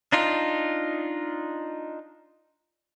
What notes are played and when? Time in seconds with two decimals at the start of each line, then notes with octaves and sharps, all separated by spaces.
0.12 D4 D#4 F4